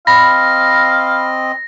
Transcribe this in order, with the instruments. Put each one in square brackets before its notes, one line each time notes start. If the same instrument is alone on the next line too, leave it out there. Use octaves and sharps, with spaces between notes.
[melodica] C4 D#5 [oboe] F5 [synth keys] B5 [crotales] A#6